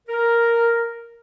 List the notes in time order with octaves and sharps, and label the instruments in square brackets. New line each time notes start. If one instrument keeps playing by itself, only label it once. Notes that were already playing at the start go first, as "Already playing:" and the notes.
[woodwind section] A#4